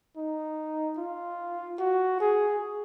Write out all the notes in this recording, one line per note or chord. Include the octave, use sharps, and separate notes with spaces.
D#4
F4
F#4
G#4